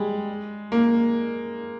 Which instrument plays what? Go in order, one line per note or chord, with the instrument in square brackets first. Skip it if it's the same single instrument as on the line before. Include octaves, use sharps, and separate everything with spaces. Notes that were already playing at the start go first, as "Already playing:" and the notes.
Already playing: [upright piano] G3 G#3
A#3